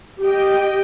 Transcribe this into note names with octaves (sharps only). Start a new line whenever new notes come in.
G4 D#5 G5